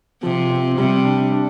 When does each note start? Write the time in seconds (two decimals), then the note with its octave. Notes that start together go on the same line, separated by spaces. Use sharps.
0.23 C3 F3
0.50 C4
0.78 C3 G3
1.05 D4
1.32 D4